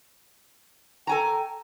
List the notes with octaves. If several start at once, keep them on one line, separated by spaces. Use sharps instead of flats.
A4 G5 G#5 A#5